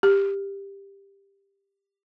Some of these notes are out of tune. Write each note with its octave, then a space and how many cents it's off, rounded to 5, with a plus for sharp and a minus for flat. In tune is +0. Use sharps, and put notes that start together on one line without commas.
G4 +10